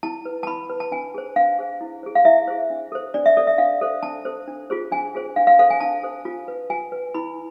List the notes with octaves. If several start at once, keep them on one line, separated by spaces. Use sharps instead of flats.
E4 A5
B4
A5
E4 B5
B4
A5
D4 G#5
G#4 C5
D4 F5
G#4 C5
E4
G#4 C5
F5
E4 E5
G#4 C5
D4
A4 C5
D4 D5
E5
A4 C5 D5
E5
D4 F5
A4 C5
D4 A5
A4 C5
D4
F4 G#4 C5
D4 G#5
F4 G#4 C5
D4 F5
F5
A4 C5 F5
G#5
D4 A5
A4 C5
F4
B4
F4 G#5
B4
E4 B5